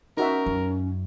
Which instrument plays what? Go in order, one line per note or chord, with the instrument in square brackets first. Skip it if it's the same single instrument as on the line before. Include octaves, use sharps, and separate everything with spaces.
[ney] C#4 [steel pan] D#4 F#4 E5 [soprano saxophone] A#4
[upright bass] F#2